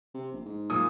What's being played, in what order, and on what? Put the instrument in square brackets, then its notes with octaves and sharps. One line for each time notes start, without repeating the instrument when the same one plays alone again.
[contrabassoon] C3
A#1
G#2
[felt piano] A#2 D#6